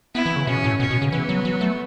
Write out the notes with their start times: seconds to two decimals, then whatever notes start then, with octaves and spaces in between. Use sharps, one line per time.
0.15 B3 E4
0.26 E3
0.36 C#3
0.47 B2 C#4
0.64 A2
0.80 B2 C#4
0.90 B2
1.02 C#3
1.12 E3 B3
1.29 F#3
1.45 F#3
1.61 A3